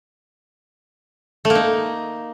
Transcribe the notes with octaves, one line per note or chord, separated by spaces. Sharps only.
A3
A#3
D#4